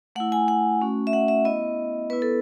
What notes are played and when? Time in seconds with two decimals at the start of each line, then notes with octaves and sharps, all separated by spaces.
0.16 A3 F#5
0.20 E4
0.32 G#5
0.48 F#5
0.81 A3 C#4 F#4
1.07 E5
1.13 F#5
1.28 E5
1.45 B3 E4 D#5
2.10 B3 E4 B4
2.22 A4